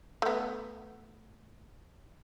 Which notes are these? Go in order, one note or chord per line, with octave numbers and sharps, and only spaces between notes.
A3 B3